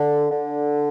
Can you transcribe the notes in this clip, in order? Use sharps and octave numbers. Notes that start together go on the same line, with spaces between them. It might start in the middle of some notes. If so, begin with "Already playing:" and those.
Already playing: D3
D3